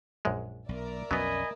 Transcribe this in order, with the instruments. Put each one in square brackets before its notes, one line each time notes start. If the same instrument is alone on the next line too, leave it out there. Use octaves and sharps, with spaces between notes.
[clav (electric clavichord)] A#1 F#2 G#3
[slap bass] B1 [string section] A#4 D5 E5
[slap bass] B1 F2 C#4 [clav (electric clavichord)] F#3 B3 [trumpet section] D#5 G#5 B5